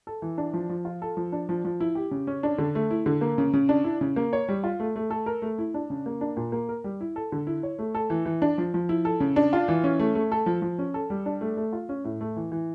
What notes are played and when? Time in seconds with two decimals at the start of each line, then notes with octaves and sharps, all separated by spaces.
0.07 A4
0.22 E3
0.38 D4
0.53 F3
0.69 F3
0.85 F4
1.02 A4
1.17 F3
1.32 D4
1.49 F3
1.65 F3
1.80 E4
1.95 G4
2.11 C#3
2.27 C#4
2.43 D4
2.58 D3
2.75 A3
2.91 E4
3.06 D3
3.21 A#3
3.38 C#3
3.53 C#3
3.69 D4
3.84 E4
4.01 C#3
4.16 A#3
4.33 C#5
4.48 G3
4.64 F4
4.80 A3
4.96 A3
5.10 A4
5.26 A#4
5.42 A3
5.58 E4
5.74 D4
5.90 C#3
6.06 A#3
6.21 D4
6.37 A#2
6.52 A#3
6.69 A#4
6.84 G3
7.01 E4
7.16 A4
7.32 D3
7.47 E4
7.63 C#5
7.79 A3
7.95 A4
8.10 E3
8.26 E3
8.42 D4
8.58 F3
8.74 F3
8.89 E4
9.05 A4
9.20 C#3
9.36 D4
9.53 F4
9.68 E3
9.84 C#4
9.99 A3
10.15 A3
10.32 A4
10.46 F3
10.62 F3
10.79 C#4
10.94 A4
11.10 G3
11.26 D4
11.41 A3
11.57 A3
11.73 F4
11.89 C#4
12.04 A2
12.21 A3
12.36 E3
12.52 E3